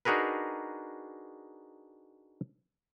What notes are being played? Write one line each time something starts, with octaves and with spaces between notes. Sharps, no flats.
D4 D#4 F#4 G#4 A#4 B4